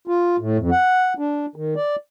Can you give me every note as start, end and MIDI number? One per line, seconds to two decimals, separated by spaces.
0.07 0.36 65
0.39 0.57 45
0.58 0.70 41
0.71 1.13 78
1.18 1.46 62
1.56 1.74 51
1.76 1.96 74